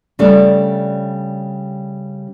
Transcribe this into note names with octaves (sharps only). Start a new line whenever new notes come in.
C#3 G3 A3 D4